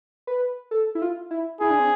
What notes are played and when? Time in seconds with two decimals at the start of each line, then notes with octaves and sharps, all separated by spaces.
0.27 B4
0.71 A4
0.95 E4
1.02 F4
1.31 E4
1.61 E4 G#4
1.70 D4
1.80 C4